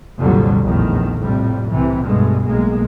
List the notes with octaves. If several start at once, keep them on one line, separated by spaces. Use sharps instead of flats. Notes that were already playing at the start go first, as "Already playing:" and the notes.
C2 F2 A#2 D3 F#3 G3
A#1 E2 A2 D#3
F2 A2 C3 G3
C2 C3 E3
G2 B2 G#3 A3
B1 A2 G#3 A#3